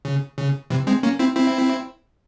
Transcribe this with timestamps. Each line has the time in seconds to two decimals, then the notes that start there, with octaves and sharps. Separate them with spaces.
0.05 C#3
0.38 C#3
0.70 C3 E3
0.87 G#3 C4
1.03 A#3 C#4
1.19 C4 E4
1.36 C4 E4